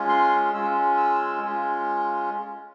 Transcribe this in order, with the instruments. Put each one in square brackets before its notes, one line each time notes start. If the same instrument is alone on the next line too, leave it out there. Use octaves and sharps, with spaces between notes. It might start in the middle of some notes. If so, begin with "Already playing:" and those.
Already playing: [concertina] G#3 C#4 F4
C6
G#3 C#4 F4 E6
E6
G#3 C#4 F4